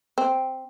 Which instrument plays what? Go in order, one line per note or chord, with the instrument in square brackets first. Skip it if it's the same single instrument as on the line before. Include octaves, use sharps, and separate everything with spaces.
[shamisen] C4